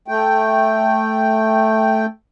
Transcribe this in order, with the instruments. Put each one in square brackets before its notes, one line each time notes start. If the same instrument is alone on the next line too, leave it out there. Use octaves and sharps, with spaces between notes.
[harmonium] A3 G5